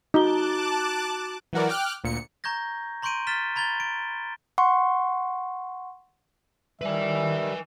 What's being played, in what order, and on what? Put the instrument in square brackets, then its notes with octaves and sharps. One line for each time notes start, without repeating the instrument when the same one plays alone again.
[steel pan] D#4 [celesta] F#4 A#5 G7 [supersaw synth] A5 D6 F#6
[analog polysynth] E3 F#3 F#4 A#4 D5
G5 D6 F6 F#6
D2 A#2 C#7
[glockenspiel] A#5 C#6 G6 G#6 A#6
A#5 C6 C#6 G6 D7 D#7
F6 A6 B6 E7 G7
A#5 B5 G#6 A6 G7
D7
[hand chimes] F#5 C6 C#6
[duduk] D#3 [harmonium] G3 [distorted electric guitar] B4 G#5 [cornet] E5